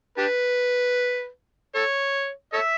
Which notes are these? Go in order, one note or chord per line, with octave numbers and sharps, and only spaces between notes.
D4 G4 B4
A4 C#5
A4 C#5 E5